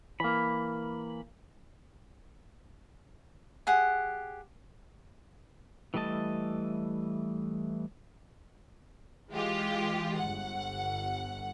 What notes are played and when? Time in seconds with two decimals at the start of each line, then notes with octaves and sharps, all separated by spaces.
0.20 E3 A#3 B5
3.67 G4 G#4 F#5
5.94 E3 G3 A3 D#5 A5
9.30 E3 G#3 F4 G4
10.17 G1 F#5